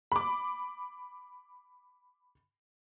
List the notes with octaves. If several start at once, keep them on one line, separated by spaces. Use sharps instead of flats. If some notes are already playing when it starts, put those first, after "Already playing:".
B5 D6